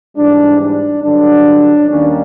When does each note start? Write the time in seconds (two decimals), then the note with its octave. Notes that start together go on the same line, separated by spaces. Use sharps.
0.17 G#2 E3 G3 D4
0.61 D4
1.04 G2 D3 F#3 D4
1.91 D#2 D#3 G3 A#3 C#4 D4